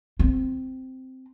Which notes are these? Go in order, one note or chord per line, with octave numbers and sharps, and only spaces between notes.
C4